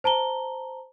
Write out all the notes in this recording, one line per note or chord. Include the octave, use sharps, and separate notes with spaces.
C5 A5 A#5 G7